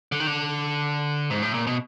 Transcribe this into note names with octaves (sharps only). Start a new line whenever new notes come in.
D3
D#3
D3
G#2
A2
A#2
B2